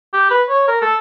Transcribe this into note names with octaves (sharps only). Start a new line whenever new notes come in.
G4
B4
C#5
A#4
A4